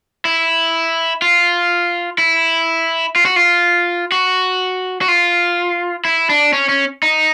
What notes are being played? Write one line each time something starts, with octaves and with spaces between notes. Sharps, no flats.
E4
F4
E4
F4
F#4
F4
F#4
F#4
F4
E4
D4
C#4
C#4
D#4